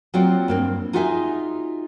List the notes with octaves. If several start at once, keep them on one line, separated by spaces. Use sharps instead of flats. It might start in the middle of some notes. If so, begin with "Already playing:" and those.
F#3 A#3 C4 F4 F#4 D5
G2 A#3 C4
D#4 F4 F#4 G#4 E5 G#5